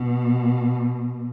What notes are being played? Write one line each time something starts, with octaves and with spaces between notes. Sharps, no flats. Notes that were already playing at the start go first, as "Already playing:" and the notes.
Already playing: B2